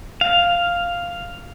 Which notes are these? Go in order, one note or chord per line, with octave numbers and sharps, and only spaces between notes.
F5